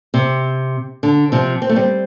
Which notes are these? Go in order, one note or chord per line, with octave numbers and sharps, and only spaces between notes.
C3
D3
C3 F3
C4
A3
G3 C4